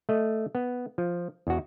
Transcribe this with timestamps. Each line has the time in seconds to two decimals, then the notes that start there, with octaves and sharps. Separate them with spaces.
0.09 A3 D#5
0.55 B3
0.98 F3
1.47 E2 F#4